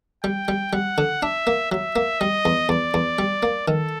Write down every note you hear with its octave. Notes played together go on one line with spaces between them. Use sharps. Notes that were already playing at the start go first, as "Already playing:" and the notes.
G3 G5
G3
G3 F#5
D3
D4 E5
A#3
F#3 E5
A#3
G3 D#5
E2
E2 D5
E2
G3
A#3
D#3 A4